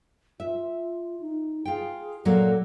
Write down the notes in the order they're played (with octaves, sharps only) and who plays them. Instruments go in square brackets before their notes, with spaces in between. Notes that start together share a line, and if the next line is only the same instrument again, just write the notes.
[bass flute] F4 [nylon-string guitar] E5
[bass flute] D#4
[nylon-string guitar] F4 G5 [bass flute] G#4
[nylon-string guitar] A#2 F#3 A#3 [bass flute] A4